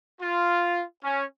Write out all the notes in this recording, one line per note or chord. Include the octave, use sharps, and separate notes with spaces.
F4
C#4